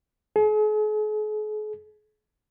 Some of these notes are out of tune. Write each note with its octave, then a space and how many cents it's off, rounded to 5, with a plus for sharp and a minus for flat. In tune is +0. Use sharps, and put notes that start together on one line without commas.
G#4 +45